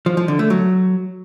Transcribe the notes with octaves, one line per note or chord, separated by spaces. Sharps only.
F3
F3
D3
A3
F#3